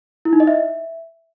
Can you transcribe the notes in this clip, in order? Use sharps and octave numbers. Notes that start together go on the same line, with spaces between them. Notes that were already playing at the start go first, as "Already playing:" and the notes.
E4
D#4
D#5
E5